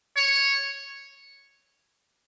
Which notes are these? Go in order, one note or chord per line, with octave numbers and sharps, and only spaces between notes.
C#5